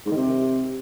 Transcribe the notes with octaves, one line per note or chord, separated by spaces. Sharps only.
G#2
D#3
C3